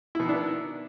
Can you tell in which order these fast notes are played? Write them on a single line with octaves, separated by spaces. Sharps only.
E4 B2 D#3 D4 B3